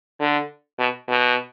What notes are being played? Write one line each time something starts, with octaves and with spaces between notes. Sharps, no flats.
D3
B2
B2